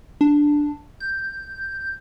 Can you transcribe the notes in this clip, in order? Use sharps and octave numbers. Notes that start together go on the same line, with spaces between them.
D4
G6